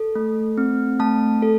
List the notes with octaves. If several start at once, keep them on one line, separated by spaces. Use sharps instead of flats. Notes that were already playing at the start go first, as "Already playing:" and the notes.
Already playing: A4
A3
C4
A3 A5
A4